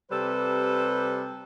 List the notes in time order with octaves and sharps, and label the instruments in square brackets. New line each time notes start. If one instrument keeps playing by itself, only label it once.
[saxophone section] C3 G3 A4 B4 C5